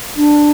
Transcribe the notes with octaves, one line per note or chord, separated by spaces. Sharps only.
D4